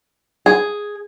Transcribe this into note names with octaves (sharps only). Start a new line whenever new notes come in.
G#4